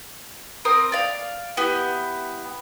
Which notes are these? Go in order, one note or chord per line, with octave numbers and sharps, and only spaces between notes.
C4 A#4 D#6
D5 F5
B3 E4 G4